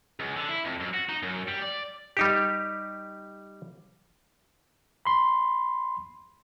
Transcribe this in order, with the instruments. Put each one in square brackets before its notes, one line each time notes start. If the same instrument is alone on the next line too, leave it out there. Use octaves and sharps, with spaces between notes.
[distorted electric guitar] C#2
D3
E4
F2
F#2
F#4
D#4
F#2
G3
D5
[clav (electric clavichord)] G3 D#4 G4
[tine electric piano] B5 C6